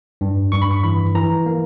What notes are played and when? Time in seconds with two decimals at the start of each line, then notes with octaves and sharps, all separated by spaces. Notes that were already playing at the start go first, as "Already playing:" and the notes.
0.21 G2
0.52 G2 C#6
0.62 B5
0.71 C#6
0.83 E3 B5
1.15 E3 A#5
1.46 A#3